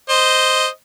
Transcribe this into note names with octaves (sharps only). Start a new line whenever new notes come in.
C5 D#5